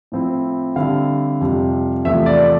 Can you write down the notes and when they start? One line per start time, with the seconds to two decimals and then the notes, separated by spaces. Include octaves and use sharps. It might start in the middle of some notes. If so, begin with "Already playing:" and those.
0.12 A2 F3 C4 E4
0.76 D3 G3 C4 E4 F5
1.41 F2 C3 G3
2.05 E2 C3 F3 A3 E5
2.26 D5